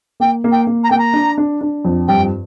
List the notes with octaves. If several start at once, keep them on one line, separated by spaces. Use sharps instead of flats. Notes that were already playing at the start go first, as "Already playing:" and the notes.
A#3 G5
A#3
G5
A#3
A#5
A#3 G5
A#5
D4
D4
D4
F2
G2 G5